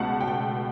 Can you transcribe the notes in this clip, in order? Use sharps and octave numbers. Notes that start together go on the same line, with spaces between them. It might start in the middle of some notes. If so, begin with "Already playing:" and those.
Already playing: C#2 B2 A3 F#5 A5
G5